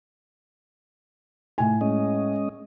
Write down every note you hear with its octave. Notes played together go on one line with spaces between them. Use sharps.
A2 G#5
G#3 C#4 D#5